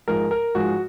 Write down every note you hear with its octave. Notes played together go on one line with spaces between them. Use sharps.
G#2 F3 G#3 A#4
A#4
G#2 F3 G#3 F#4